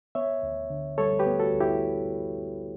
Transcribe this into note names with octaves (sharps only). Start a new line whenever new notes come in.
B3 C#5 E5
D2
D3
G3 A4 C#5
G4 B4
B3
F#4 A4
D2
E4 G4